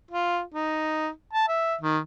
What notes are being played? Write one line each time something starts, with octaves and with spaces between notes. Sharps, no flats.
F4
D#4
A5
E5
D#3